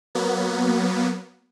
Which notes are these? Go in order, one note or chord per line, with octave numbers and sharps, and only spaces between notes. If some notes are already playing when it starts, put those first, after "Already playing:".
F#3 A#3 B3